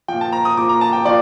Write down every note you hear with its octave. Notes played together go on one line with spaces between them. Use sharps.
A#2 F3 G5
A5
A#5
D#6
A#2 F3 D6
A#5
A5
G5
A#2 F3 D5